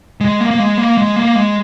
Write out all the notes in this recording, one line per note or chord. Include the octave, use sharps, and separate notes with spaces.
G#3
A#3
A#3
G#3
A#3
G#3
A#3
G#3